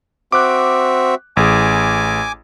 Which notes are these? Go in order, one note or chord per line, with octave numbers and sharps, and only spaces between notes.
C4 F#4 E5 D6 F#6
A1 G#4 G#5 D6